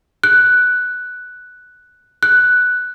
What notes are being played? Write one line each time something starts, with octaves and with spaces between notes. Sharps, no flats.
F#6
F#6